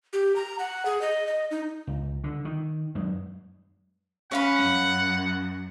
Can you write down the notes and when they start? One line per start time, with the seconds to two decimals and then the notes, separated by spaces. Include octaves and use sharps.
0.13 G4
0.36 A#5
0.59 F#5
0.85 G#4
1.02 D#5
1.27 D#5
1.51 D#4
1.87 C#2
2.24 D3
2.45 D#3
2.95 F#2 G#3
4.31 C#4 C#5 F5 F#5 B5
4.62 F#2